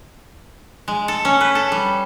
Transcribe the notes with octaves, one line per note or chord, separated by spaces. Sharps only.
G#3
A4
C#4
B4
A4
G3